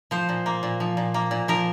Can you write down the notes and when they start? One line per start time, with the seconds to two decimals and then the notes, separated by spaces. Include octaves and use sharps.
0.11 F3 C5
0.29 A#2
0.46 A#3
0.63 A#2
0.80 F3
0.97 A#2
1.14 A#3
1.31 A#2
1.48 F3 A#4